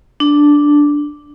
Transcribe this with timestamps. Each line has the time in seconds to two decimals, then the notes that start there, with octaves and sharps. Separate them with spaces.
0.20 D4